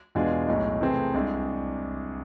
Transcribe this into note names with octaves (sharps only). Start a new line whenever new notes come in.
E2 B2 G#3 D4 F4
B1 A2 G#3
C3 E3 A3 C4 G#4
C2 C3 G#3 D4